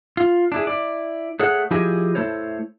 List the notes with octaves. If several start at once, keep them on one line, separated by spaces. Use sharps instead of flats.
F4
D4 E4 G#4
E4 D5
A3 G#4 C#5 F#5
F3 E4 G4 G#4 D#5 G#5
A3 E4 A4 C5 C#5